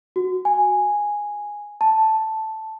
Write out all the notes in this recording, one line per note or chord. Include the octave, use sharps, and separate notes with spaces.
F#4
G#5
A5